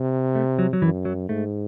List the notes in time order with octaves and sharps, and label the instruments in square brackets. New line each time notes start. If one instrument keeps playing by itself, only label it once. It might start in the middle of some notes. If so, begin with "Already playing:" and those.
Already playing: [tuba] C3
[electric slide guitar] A3
F#3
F#3
[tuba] F#2 [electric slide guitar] E3
[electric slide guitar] F#3
[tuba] G#2 [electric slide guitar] A3